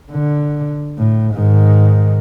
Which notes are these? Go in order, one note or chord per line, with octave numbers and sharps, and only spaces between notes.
D3
A2
G#2 D#3